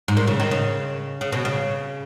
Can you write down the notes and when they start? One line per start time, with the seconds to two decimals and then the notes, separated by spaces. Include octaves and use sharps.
0.08 G#2
0.17 A#2
0.27 C#3
0.40 D#3
0.51 C#3
1.21 C#3
1.32 B2
1.45 C#3